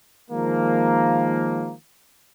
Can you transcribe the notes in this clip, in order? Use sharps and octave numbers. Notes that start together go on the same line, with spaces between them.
D#3 F3 G#3 A#3